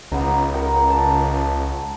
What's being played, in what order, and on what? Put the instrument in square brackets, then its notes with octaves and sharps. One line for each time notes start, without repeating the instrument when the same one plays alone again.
[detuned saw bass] C#2 [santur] B3 D#4
[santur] A#4 F#5 G5
A5